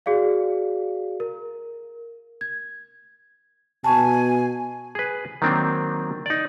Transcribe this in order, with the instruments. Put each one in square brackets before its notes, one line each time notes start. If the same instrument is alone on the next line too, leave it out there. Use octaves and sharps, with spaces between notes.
[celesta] F#4 G#4 D5 F5
A#4
G#6
[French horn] B2 [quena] G#5 [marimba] A5 C#6
[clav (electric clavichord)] G#4 B4
D#3 F#3 A#3 C4 D4
D#4 D5